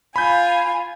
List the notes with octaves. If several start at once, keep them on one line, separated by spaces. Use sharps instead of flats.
F4 G#5 B5 G6